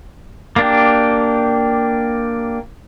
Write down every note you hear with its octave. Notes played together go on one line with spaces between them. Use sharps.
A#3 D4 G4